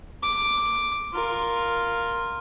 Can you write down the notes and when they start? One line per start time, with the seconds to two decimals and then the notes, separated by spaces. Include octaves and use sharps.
0.23 D6
1.14 F4 A#4